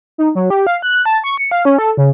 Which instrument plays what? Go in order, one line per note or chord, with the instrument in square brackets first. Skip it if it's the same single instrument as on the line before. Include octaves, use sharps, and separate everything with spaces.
[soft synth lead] D#4
F#3
G4
F5
F#6
A5
C#6
C#7
F5
C#4
A4
C#3